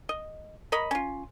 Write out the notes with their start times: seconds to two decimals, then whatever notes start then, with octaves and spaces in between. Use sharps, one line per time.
0.09 D#5
0.72 A#4 C#5 D#5 B5
0.91 C#4 F4